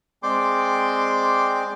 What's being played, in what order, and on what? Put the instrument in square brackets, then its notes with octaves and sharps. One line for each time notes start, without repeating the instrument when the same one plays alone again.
[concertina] G#3 C4 D5 G5 C6 D6